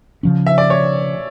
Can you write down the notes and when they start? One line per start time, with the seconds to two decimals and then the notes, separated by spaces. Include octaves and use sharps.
0.23 C#3 F3 C#4
0.46 E5
0.58 D5
0.70 C#5